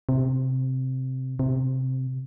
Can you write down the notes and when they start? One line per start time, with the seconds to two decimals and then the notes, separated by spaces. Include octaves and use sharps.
0.09 C3
1.39 C3